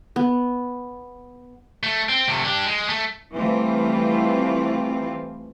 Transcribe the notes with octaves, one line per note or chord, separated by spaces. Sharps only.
B3
A3
C4
C3 A3
D4 G4
G#3
A3
E3 G3 A3 C4 F4